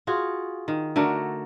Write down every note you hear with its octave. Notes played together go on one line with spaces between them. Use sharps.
F4 F#4 G#4
D#3
D3 A3 F#4 A#4